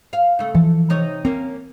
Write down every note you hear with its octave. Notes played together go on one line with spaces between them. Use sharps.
F5
C#3 A3
E3 F3 A4
C3 D#4 C#5
A#3 C4 C#4